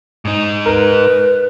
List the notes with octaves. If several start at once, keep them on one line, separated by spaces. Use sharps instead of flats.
G#2 D#4
A#4 B4